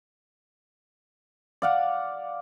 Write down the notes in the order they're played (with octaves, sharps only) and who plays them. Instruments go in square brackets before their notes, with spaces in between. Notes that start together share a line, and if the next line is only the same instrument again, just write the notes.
[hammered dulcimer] D5 F5 F#5